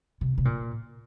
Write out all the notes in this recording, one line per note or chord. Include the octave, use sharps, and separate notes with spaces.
C3
C3
A#2